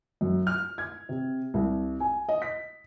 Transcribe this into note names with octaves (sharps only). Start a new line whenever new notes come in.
F#2
F6
G#6
C3
C2
G#5
D#5
B6